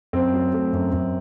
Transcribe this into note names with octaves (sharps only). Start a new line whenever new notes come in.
F#2 C4
F#3
A3
F#2
F#2